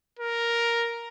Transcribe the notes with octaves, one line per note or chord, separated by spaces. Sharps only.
A#4